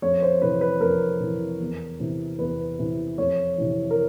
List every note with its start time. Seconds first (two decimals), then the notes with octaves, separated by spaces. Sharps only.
0.02 F2 C#5
0.22 C5
0.42 C3 E3 B4
0.61 B4
0.81 F2 A#4
1.20 C3 E3
1.60 E2
2.00 C3 E3
2.39 E2 B4
2.79 C3 E3
3.18 F2 C#5
3.58 C3 E3
3.91 A#4